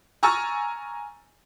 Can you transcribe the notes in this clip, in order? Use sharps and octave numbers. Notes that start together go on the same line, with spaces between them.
G#5 A#5 C#6 E6 F6 A6